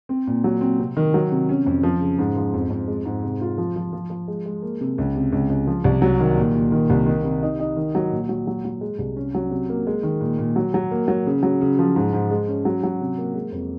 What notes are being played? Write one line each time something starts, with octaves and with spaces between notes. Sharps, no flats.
C4
A#2
F#3
C4
C3
D#3
F#3
C3
C#4
F2
F3
C#3
G#2
F3
F2
F2
G#3
G#2
C3
F4
F3
F3
F3
F3
G#3
G#3
A#3
C3
C#2
C3
C#2
C#2
F3
C2
F#3
D#3
A#2
A#2
D#3
C2
D#3
C3
D#4
D#4
D#3
F#3
A#2
F#3
F#3
F#3
G#3
C2
C#4
F#3
C3
A#3
G#3
D#3
A#2
A#2
F#3
F#3
A#3
F#3
C#3
F#3
C#3
F3
G#2
G#2
G#3
C#4
F#3
F#3
C3
A#3
G#3
F2